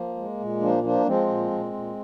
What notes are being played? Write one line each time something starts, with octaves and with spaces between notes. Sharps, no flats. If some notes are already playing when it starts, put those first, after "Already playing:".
Already playing: F3 A#3
G#3
A#2
F3 A#3 D4
F3 A#3 D4
F3 G#3 C4
A#2
A#2
A#2